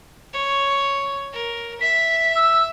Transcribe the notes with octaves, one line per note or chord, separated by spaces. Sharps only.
C#5
A#4
E5 B6
E6